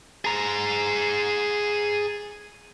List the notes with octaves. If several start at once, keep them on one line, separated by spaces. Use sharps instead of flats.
G#4 A#5